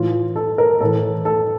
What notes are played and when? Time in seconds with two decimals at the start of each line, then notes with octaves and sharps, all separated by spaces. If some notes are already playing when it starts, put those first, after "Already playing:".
Already playing: A2 E3 F4
0.36 A4
0.58 A#4
0.80 A2 E3 A4
1.25 A4